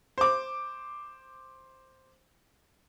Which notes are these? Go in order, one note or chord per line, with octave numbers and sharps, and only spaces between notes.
C5 D6